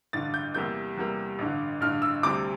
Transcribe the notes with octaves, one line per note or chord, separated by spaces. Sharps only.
A1 G2 D3 A6
G6
E2 C3 G3 A#3 G6
E2 C3 G3 A#3
A1 G2 D3
A1 G2 D3 F6
E6
D2 C3 G3 C4 D6